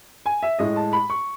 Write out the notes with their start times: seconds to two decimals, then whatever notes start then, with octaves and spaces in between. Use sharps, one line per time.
0.26 G#5
0.43 E5
0.59 A2 G#3 D#5
0.76 A5
0.93 B5
1.10 C#6